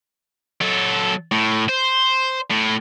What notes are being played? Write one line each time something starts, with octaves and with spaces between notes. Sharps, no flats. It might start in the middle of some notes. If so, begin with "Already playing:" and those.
F#3 A4
A2
C5
A2